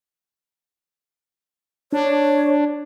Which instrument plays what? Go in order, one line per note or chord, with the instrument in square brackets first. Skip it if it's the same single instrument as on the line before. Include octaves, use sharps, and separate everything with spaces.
[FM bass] D4 [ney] C#5